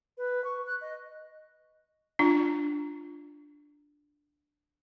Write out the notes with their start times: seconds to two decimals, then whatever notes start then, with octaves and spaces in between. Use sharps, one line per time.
0.18 B4
0.44 C#6
0.67 F#6
0.81 D#5
2.19 D4 F4